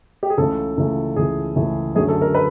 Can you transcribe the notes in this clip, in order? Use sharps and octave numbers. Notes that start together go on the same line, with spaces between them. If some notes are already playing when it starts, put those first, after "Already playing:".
G4
G#4
C#2 C#3 E3 A3 A4
C#2 C#3 E3 A3
C#2 C#3 E3 A3 G#4
C#2 C#3 E3 A3
F#2 D3 F#3 A3 G#4
A4
A#4
B4